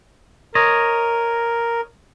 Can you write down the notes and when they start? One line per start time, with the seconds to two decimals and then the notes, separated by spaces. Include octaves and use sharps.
0.55 A#4 C#5 D#5